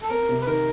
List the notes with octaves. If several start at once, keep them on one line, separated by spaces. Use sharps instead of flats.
A4
C4 A#4
C3
B4
D#3 A#4